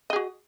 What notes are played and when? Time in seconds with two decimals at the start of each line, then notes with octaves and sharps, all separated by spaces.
0.10 D#5
0.13 G#4
0.16 F#4